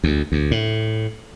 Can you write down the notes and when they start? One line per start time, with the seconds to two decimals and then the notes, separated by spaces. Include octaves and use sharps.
0.04 D2
0.32 D2
0.51 A2